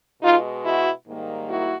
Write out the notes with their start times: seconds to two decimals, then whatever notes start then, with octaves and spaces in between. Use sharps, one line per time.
0.21 B2 G#3 D#4 F4
0.64 E4 F#4
1.08 G#2 D#3 G3 A#3
1.50 E4 F#4